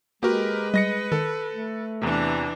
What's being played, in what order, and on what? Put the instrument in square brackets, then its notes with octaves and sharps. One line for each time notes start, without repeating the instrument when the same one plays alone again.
[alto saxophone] G#3 [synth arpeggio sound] A#3 F#4 [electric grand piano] G4 A#4 [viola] B4
[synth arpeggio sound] G3 [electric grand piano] D#5 A#6 C#7
[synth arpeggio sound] D#3 [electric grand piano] A4
[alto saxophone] A3
[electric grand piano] E2 C3 [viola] E3 D4